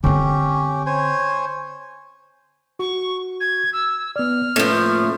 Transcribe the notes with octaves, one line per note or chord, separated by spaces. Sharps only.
D3 C4 C#4 G4
C5 C#5 G#5
F#4 C#6
G#6
E6
B3 D5 F6
A2 F3 A#3 C#4 B4